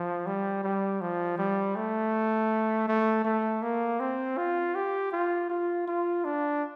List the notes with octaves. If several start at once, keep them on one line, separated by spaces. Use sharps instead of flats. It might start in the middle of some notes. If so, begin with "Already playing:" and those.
Already playing: F3
G3
G3
F3
G3
A3
A3
A3
A#3
C4
F4
G4
F4
F4
F4
D4